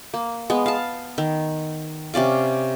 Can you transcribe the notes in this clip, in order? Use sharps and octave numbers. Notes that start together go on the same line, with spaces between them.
A#3
G#3 B3
F5 A5
D#3
C3 C#4 D5 F5